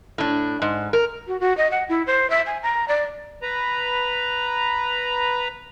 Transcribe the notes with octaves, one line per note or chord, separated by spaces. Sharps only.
A2 D4
G#2
A#4
F#4
F#4
D#5
F#5
E4
C5
E5
G#5
A#5
D5
B4 A#5